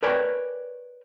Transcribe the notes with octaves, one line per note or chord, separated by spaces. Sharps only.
A#4 B4 C#5 D5 G5 G#5